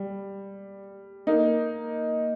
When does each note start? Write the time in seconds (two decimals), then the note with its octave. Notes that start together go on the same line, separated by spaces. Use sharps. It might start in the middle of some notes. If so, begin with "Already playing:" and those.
Already playing: G3
1.27 A#3 D#4